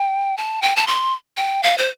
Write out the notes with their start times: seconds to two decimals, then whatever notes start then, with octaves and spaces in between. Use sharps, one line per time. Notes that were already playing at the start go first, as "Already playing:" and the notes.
Already playing: G5
0.37 A5
0.62 G5
0.76 A5
0.87 C6
1.37 G5
1.63 F5
1.78 C5